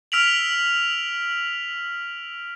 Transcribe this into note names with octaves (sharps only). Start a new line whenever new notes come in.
E6 F6 B6 D7 F7 F#7